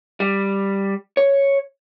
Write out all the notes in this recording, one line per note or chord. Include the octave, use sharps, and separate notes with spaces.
G3
C#5